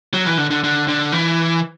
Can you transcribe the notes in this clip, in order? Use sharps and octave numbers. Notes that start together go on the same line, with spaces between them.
F#3
E3
D3
D3
D3
D3
E3